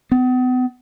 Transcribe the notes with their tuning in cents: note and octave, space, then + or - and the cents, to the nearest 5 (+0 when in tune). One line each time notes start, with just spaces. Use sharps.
B3 +40